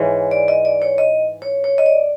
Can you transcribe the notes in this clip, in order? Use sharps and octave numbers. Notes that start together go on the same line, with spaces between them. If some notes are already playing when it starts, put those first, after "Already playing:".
Already playing: G#2 E3 G#3 C#5
D5
D#5
D5
C#5
D#5
C#5
C#5
D#5
D5